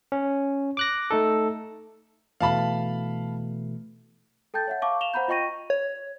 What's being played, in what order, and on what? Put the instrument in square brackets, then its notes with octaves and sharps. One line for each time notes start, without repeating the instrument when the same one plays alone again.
[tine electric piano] C#4
D6 F#6 A#6
A3 D#4 A4
[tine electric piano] B2 E3 A3 [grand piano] F5 A5 B5
[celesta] A4 G5 A5 G6 A6
C#5 E5 F#5
F5 A5 C#6 D6
F5 E7 F7 G7
C5 F#5 A#5 B5 G6
F4 D#5 G5 C#6 A#6 D#7
[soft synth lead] C#5